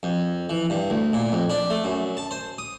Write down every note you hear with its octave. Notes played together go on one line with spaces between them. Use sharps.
F2
E3
G2
D2
A#2
F2
D4
A3
F#2
A5
C5
D#6